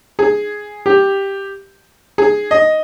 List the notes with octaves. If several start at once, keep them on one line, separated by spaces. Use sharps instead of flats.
G#4
G4
G#4
D#5